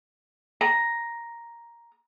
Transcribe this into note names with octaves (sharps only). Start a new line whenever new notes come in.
A#5